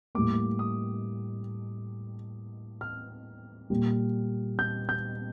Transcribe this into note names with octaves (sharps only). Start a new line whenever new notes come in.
A2 G3 A#3 D6
D#6
F6
A#2 G3 A#3
G6
G6